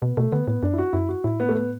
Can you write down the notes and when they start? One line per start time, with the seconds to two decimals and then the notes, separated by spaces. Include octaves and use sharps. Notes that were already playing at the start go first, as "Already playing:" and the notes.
0.02 B2 B3
0.17 B2 A3
0.32 D3 B3
0.47 A2 B3
0.63 F#2 D4
0.73 E4
0.78 F#4
0.93 F#2 E4
1.09 F#4
1.24 A2 E4
1.40 B3
1.49 A3
1.55 B3